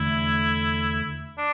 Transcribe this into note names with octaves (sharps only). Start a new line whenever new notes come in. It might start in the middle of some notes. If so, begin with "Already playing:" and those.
Already playing: E2 D3 A3 E4
D4